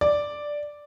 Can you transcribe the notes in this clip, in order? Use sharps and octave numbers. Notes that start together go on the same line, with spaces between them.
D5